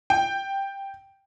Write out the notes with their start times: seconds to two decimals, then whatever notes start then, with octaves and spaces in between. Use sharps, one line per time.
0.10 G5